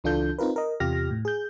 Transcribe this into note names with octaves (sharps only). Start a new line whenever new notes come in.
C#2 E3 D4 F4 A4 G6
C4 D#4 F4 A#4 B4
A#4 D#5
E2 C3 F4 G4 F6 A#6
A2
G#4 G6